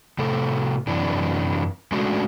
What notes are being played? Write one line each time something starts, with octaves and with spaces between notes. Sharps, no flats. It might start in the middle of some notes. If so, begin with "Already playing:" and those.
A2 C3 A4
F#2 C3 E3 D4
G#3 A3 C#4 D4 F#4